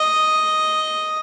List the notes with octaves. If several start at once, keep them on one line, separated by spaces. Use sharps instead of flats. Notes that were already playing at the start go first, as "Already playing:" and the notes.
Already playing: D#5